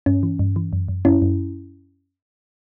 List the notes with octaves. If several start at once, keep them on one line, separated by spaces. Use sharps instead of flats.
G2 C#4
E3
G2
E3
F#2
F#2
F#2 C#4 E4
F#2